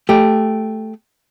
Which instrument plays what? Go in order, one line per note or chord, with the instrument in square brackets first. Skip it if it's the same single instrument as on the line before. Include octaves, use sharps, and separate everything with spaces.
[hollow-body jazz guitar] A3 G4